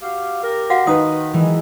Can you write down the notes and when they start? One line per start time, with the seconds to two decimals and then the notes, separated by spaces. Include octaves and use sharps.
0.02 F#4 G4 F5
0.43 G4 A#4
0.70 F#4 F5 F#5
0.87 D#3 D#4 B4 D#6
1.33 E3 G#3